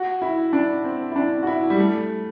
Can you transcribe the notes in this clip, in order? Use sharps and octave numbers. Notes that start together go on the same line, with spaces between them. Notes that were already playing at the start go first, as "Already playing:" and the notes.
Already playing: F#4
E4
D4
C4
E4
D4
F#4
E4
G3
A3